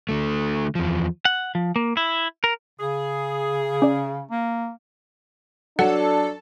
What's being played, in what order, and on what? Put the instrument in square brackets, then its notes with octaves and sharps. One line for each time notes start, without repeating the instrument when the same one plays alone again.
[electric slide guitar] D3 A3
E2 F3
[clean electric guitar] F#5
F3
A#3
E4
A#4
[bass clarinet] C#3 [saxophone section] G#4
[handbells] C#4 D5
[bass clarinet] A#3
[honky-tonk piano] F#3 [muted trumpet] D4 [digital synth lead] A4 [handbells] F#5